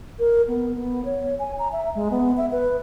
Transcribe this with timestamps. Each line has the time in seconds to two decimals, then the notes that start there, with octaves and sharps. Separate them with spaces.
0.19 A#4
0.48 B3
0.76 B3
1.05 C#5
1.39 G#5
1.59 A#5
1.72 E5
1.95 G#3
2.11 B3
2.37 E5
2.52 B4